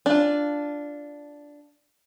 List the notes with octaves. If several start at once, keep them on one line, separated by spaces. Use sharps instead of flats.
D4 F4